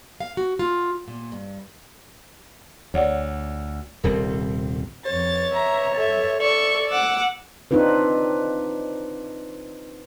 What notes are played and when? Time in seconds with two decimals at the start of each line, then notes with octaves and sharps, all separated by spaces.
0.20 F5
0.37 F#4
0.59 F4
1.08 A#2
1.32 G2
2.94 D2 C#5 D5 F#5
4.04 D#1 C2 C4 A#4
5.06 F2 C#5 A6
5.52 E5 A#5
5.94 A4 E5
6.41 A4 D5 C#6 E6
6.88 F#5 D6 E6
7.71 C4 D4 D#4 F4 B4